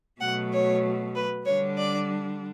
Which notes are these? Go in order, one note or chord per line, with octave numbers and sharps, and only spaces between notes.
B2 F#3 A3 F#5
C#5
B4
D3 G3 D4 C#5
D5